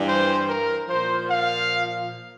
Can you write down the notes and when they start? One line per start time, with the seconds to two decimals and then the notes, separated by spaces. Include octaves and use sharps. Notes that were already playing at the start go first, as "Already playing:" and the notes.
Already playing: G2 E3 G3
0.08 C5
0.49 A#4
0.89 A#2 F3 C5
1.28 F5